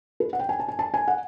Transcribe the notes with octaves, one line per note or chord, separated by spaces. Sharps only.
B4
F#5
G5
G#5
A5
G#5
A5
G#5
F#5